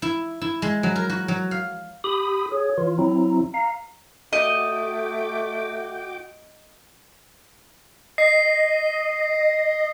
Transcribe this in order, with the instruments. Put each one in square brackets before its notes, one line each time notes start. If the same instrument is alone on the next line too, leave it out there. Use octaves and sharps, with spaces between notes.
[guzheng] E4
E4
G#3
F#3
A#4
F#4
F#3
F5
[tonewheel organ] G4 B5 D#6
[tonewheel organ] G#4 [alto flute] C#5
[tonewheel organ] E3 F4
[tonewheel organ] F#3 C4 E4 [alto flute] A#5
[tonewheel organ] F5 [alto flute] A#5
[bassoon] A3 [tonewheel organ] F#4 G5 D6 [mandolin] D#5
[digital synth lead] D#5 [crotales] C7